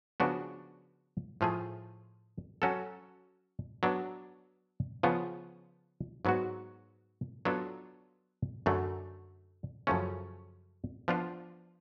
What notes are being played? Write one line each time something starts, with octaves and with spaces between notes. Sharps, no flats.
C#3 F3 B3 D4 F#4
A2 F3 A3 F4 G#4
F#3 C#4 F#4 A4
F#3 B3 D4
C#3 F3 B3 F4
G#2 F#3 B3 F#4
F#3 B3 D4 F4 A4
F#2 D3 F#3 A3
F#2 C#3 F3 A3 C#4
F3 B3 D4 F4